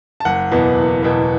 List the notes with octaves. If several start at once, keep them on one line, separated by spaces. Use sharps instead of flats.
A5
F#1 F#5
E2 B2 B3
F#1
E2 B2 B3